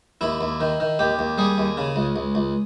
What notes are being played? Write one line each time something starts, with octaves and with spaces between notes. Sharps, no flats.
D#2 E4
D#2
D#3
D#3
D#2 G4
D#2
G3 G#4
D#2
C#3
C#2
C#2
C#2